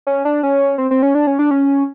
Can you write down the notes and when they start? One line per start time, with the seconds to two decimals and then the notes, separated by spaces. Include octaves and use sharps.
0.07 C#4
0.25 D4
0.43 C#4
0.78 C4
0.91 C4
1.02 C#4
1.15 D4
1.27 C#4
1.39 D4
1.51 C#4